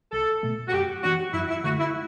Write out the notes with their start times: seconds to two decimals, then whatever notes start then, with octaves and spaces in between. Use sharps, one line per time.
0.12 C2 A4
0.43 B2 A3
0.68 F#4
0.73 F#2 G4
1.03 E3 B3 D4 F#4
1.33 F#2 E4
1.49 E4
1.64 D3 A3 F#4
1.79 E4